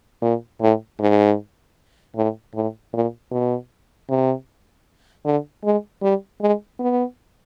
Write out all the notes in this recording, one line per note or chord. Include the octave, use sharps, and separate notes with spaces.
A#2
A2
G#2
A2
A2
A#2
B2
C3
D3
G#3
G3
G#3
B3